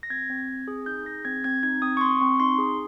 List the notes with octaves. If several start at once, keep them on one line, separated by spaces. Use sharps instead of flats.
A#6
C4 G#6
C4
C4
G#4
D#4 G6
G#4 A#6
C4 G#6
C4 G#6
D#4 G#6
C4 D#6
C#6
C4 C6
C4 C#6
D#4 C6
G#4